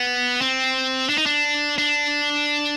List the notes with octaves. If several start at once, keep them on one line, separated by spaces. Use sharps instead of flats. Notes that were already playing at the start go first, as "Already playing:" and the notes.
Already playing: B3
C4
D4
D#4
D4
D4